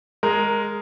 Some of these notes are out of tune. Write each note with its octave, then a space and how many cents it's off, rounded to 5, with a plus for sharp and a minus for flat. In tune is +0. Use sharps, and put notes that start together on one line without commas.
G#3 +0 A#4 +0